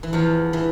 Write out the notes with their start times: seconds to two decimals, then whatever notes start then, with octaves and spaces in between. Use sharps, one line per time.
0.03 E3
0.13 E2 F3
0.53 E3